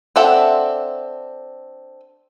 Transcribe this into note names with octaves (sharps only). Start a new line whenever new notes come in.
C4 D4 A4 E5 F#5